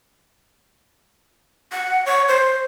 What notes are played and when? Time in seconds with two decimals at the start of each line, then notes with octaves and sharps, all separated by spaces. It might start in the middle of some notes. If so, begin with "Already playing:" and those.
1.72 F#5
2.06 C#5
2.28 C5